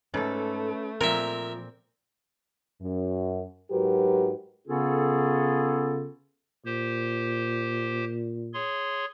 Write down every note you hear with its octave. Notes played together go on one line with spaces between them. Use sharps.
G#2 A3 C#4 A4 B4
A#2 F3 C4 A#4 E5
F#2
G#2 F#3 F#4 G4 A#4 B4
C#3 B3 C#4 F4 G#4 A4
A#2 G4 C5
G#4 C#5 C6